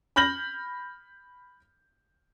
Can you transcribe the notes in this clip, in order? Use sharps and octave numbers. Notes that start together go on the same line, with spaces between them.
B5 F6 G6 A#6 F#7